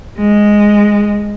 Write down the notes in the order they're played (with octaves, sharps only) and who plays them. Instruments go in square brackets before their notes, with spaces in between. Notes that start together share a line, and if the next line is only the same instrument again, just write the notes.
[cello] G#3